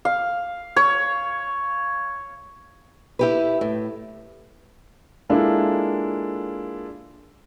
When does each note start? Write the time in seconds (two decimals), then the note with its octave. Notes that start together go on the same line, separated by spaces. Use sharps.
0.05 F5
0.76 C#5
3.19 E4 G4 B4
3.61 A2
5.29 G#3 A#3 D4 E4 F4 A4